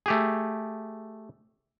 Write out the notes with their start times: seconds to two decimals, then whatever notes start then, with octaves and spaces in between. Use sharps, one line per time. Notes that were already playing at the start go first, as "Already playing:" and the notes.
0.06 A3 G4 G#4